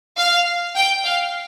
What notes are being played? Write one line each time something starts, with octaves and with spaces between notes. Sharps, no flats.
F5
G5
F5